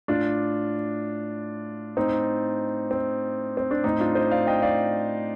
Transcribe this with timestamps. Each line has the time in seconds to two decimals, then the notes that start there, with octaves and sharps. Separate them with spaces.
0.08 A2 D4 F4
1.97 A2 C4 D#4
2.91 C4
3.57 C4
3.71 D4
3.84 A2 C4 D#4
4.00 D4 F4
4.15 C5 D#5
4.31 D5 F5
4.47 D#5 G5
4.62 D5 F5